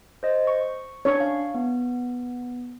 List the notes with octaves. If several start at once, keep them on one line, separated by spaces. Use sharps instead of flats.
C5 D#5
C#6
C#4 D4 C#5 C#6
F5
B3